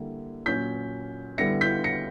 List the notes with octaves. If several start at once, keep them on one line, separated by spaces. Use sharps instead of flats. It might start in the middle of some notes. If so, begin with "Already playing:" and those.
Already playing: D3 G3 A#3 E4
A#2 F#3 C#4 G6 B6
D3 G3 B3 E4 A#6 C#7
G6 B6
A#6 C#7